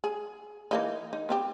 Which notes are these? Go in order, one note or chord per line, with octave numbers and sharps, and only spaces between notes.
G#4
E3 A#3 D#4
D#4
B3 C4 G4